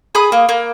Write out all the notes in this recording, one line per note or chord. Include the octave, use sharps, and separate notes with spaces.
G#4 B5 D#6
A#3
A#3